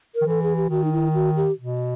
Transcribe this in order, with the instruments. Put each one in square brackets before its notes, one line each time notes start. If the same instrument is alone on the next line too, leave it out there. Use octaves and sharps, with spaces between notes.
[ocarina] A#4
[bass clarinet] D#3
[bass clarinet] E3 [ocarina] A4
[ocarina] G#4
G4
[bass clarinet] D#3 [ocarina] F#4
[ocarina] D#4
E4
F#4
G4
[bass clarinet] B2